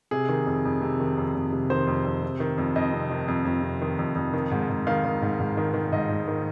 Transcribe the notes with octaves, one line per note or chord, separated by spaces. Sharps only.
C3 G#4
D#3
F2
F2
C3
D#3
F2
F2
C3
D#3 C5
F2
F2
C3
D#3
F2
F2 D#5
C3
D#3
F2
F2
C3
D#3
F2
F2
D#3
G#2
G#2
D#3 F5
D#3
G#2
G#2
D#3
D#3
G#2 D#5
G#2
D#3